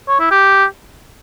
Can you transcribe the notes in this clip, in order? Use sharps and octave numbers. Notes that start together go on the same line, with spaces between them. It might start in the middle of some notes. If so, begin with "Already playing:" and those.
C#5
E4
G4